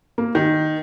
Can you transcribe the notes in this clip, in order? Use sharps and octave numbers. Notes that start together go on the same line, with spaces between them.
A#3
D#3